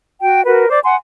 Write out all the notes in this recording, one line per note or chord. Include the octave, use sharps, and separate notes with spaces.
F#4 G5
F#4 A#4 B4
C5 D5 D6
F#5 G#5 C6